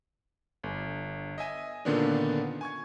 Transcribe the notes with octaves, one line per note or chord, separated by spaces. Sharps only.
G1
D#5 E5 G#5 D#7
A#2 D3 D#3 B3 C#4 D4
G#5 C#6 G#6